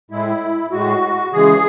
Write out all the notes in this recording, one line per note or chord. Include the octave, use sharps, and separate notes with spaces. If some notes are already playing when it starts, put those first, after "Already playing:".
A2 G#3 E4
A2 G#3 F#4
C#3 E3 G#3 G#4